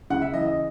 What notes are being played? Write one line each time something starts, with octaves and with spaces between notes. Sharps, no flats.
C#3 F#5
E5
E3 D#5
D#5